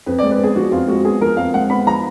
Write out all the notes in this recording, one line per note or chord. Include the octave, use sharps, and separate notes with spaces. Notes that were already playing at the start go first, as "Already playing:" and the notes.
F2 B4
D5
G#3
B4
B3 G#4
F3 F#4
F2 F4
G#3 F#4
B3 G#4
F3 A#4
F2 F5
G#3 F#5
B3 B5
F3 A#5